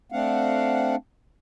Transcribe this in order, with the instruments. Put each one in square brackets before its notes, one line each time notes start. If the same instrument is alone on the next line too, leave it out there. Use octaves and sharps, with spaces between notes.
[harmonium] A3 C4 D4 F5 F#5